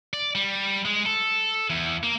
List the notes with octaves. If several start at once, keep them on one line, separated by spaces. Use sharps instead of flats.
D5
G3
G#3
A4
E2
A#3